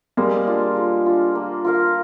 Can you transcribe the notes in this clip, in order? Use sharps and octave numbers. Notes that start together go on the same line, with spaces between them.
G3 G#3 A#3
D4 F4
G#3
D4 F4
A#3
F4 A#4 F5